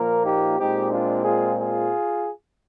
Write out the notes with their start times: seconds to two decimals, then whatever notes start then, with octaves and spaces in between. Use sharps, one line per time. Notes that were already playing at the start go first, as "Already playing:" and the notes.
Already playing: A#2 F3 A#3 A#4
0.24 D#4 G4
0.58 A#2 G#3 C4 D#4 G4
0.92 D4 F4
1.25 F4 G#4
1.59 F4 G#4